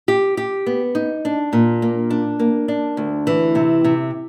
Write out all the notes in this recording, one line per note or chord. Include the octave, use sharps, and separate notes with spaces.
G4
G4
B3
D#4
D4
A#2
A#3
D4
A#3
D4
D2
E3
C3
C3